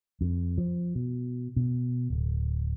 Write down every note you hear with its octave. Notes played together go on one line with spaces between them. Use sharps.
F2
F3
B2
B2
D1